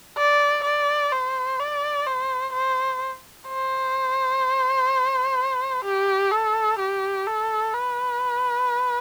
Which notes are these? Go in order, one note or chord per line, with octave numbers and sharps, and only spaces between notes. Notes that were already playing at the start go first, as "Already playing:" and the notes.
D5
D5
C5
D5
C5
C5
C5
G4
A4
G4
A4
B4